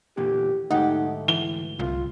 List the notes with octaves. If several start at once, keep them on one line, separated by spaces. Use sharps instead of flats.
E2 A#2 D3 G4
D2 G#2 A3 D#4 G4 F#5
E3 G7
C2 F4